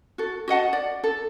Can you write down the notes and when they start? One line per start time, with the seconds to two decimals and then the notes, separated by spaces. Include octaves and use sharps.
0.18 F#4 A4
0.48 F#4 D#5 F#5 A5
0.73 D5
1.04 A4